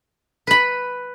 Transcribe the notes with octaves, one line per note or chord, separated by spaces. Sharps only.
B4 B5